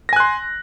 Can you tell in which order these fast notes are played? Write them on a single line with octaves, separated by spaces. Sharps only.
A#6 G#5 F#6 C6